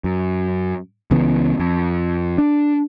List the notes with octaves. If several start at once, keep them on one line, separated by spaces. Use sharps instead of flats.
F#2
C#2 C#3 E3 B3
F2
D4